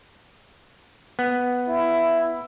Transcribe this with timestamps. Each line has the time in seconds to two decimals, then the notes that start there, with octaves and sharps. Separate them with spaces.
1.19 B3
1.68 E4